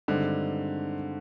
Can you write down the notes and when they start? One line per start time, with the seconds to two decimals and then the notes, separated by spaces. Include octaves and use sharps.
0.08 G2 D3 D#3 G#3 C4